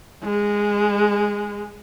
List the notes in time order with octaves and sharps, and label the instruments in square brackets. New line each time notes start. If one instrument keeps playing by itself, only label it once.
[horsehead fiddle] G#3